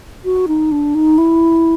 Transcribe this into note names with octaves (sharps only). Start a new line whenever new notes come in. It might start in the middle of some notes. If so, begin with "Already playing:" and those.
F#4
D#4
D4
D#4
E4